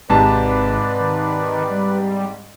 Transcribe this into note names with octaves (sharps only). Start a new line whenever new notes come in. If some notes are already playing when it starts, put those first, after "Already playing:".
G#1 G#2 C3 B4 D5 A5
D#3
G3